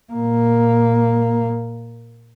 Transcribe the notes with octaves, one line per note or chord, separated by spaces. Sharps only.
A#2 A#3